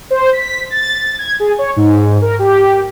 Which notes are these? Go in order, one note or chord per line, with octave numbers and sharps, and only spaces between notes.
C5
B6
A6
G#6
G#4
C#5
G#2
A#4
G4